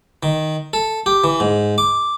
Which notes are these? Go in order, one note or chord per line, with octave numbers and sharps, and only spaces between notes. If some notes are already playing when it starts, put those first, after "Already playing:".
D#3
A4
G4
E3
G#2
D6